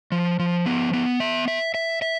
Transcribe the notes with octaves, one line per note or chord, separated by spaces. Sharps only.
F3
F3
B3
B3
E5
E5
E5
E5